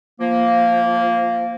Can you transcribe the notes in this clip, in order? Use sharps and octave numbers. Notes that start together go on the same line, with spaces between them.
F3 A#3